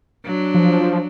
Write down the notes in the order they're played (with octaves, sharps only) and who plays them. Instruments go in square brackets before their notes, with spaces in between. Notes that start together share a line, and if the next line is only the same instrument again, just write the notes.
[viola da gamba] F#3 D4
[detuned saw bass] F3